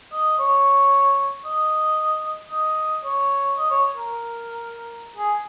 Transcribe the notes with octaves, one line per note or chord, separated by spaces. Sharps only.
D#5
C#5
D#5
D#5
C#5
D#5
C#5
A#4
G#4